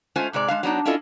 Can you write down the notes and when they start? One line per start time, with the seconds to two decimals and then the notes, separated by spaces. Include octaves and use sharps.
0.16 G#3 A3 C#4 F4 C5 G#5
0.33 G#2 C3 G#3 D5
0.48 G#3 D4 F5
0.63 F#3 B3 D4 D#4
0.85 C#4 D4 E4 F4 A4 D#5